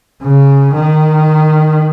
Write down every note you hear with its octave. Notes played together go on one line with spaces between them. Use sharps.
C#3
D#3